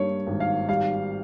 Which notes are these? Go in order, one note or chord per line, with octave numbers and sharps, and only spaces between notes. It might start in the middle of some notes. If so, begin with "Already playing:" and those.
Already playing: G2 A#3 C#5
G#1
F5
G3 F5